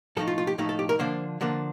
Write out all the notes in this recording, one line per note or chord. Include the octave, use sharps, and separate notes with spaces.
A2 F3 A3 D#4 A4
F4
F4
G4
A2 F3 A3 D#4
A4
G4
A#4
D3 F3 A#3 D4 C5
D3 F3 A#3 D4